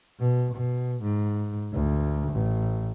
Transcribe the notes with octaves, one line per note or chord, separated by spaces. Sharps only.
B2
B2
G#2
D2
A1